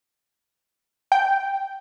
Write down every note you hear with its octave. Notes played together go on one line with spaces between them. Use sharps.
G5